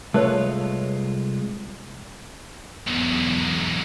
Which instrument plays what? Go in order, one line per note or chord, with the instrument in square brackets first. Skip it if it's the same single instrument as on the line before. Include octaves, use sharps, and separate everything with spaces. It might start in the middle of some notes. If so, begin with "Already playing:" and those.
[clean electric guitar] C2 G#3 F4 [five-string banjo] A3 B4 C#5
[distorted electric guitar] B1 E2